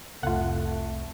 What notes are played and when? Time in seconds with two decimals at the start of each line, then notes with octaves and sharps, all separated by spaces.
0.23 F1 C2 A3 F4 F#5